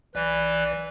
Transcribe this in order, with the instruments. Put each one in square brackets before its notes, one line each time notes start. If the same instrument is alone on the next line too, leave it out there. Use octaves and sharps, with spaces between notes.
[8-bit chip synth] B1 D5 [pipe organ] E3 B4